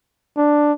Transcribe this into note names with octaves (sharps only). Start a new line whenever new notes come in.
D4